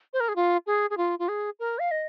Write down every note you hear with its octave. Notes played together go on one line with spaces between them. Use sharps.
C5
A#4
G#4
F4
G#4
G#4
F4
F4
G#4
A#4
F5
D#5